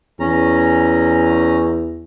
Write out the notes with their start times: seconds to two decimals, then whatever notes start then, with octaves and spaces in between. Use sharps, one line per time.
0.20 E2 C#4 A#5